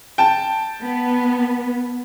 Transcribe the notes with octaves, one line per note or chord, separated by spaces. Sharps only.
G5 A5
B3